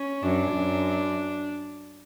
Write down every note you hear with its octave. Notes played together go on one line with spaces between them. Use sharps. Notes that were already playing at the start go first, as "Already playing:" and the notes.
Already playing: C#4
F#2 D4
F#2